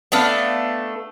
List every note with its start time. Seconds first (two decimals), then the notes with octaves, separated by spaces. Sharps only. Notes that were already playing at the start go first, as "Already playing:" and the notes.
0.12 A3 B3 D4 F5